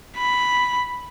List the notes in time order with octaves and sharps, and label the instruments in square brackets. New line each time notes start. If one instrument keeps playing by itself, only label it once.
[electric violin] B5